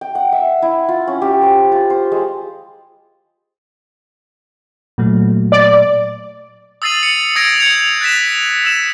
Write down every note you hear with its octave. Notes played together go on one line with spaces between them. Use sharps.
G5
F#5
E5
E4
F4
C#4
G4
C5
F4
C5
G#3
A#2 F#3 A3
D5
D#6 E6 A6 C7 D#7 F#7
C#7
D#6 G#6 A#6 D7 F7
G6 G#6 A#6 C#7 F7 F#7
F#6 A6 B6 E7
E6 E7